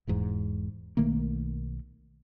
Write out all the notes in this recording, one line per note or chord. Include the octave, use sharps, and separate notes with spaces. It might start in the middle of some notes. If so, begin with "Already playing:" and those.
E1 E2 G#2
B1 D#3 A3 A#3